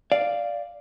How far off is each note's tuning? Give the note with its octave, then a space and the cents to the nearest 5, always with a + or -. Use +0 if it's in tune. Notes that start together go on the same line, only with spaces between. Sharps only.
D5 +0 F5 -5